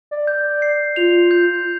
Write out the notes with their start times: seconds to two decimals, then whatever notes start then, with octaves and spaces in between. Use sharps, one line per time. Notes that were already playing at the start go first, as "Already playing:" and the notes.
0.11 D5
0.27 G6
0.62 C7
0.96 F4 F7
1.31 G6